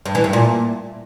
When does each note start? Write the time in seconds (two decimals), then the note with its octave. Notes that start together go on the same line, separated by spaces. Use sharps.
0.06 G2
0.15 E3
0.24 G2
0.33 A#2